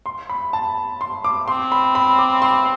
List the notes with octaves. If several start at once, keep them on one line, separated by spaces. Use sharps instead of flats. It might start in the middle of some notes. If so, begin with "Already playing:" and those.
C6
B5
A5
C6
D6
C4 C6
B5
B5
D6
C6